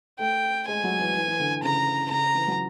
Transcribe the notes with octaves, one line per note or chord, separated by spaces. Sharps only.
A3 G5
G#3 G#5
F#3
E3
E3
E3
D3
C#3 A#5
C#3 A#5
E3
F#3